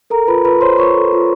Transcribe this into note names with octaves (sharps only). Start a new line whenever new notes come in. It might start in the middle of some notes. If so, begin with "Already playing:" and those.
A4 A#4 A#5
F4 B4 B5
F4 B4 B5
C5 C#5 C6
F4 C#5 C#6
A4
F4